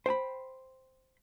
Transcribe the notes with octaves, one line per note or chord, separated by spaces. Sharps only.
C5 G5 G#5 B5